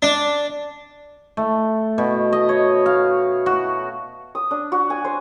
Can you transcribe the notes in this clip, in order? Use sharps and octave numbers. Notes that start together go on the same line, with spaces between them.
D4
A3
B2
D#5
C#5
F5
F#4
D#6
D4
F#4
G#5
C5